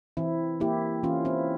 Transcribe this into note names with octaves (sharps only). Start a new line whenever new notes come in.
E3 C4 E4
A#3 E4 G4
E3 C#4 F4
C4 E4